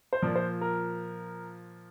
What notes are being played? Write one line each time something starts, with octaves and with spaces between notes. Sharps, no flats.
C5
A#2 F3 D5
C5
A#4